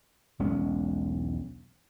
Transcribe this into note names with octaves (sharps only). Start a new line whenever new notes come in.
E1 B1 G#3 C#4